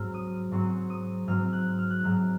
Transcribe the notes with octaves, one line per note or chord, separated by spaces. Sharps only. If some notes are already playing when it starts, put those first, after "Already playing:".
Already playing: G#2 F#3 C4 F6
D#6
G#2 F#3 C4 C#6
D#6
G#2 F#3 C4 F6
F#6
F6
F#6
G#2 F#3 C4 F6